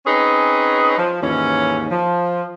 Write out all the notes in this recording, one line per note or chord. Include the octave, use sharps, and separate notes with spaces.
C4 C#4 D#4 G#4 B4
F3
D#2 G#2 E3 C#4
F3